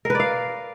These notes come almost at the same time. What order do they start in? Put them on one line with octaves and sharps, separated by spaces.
A#4 B4 D5 F5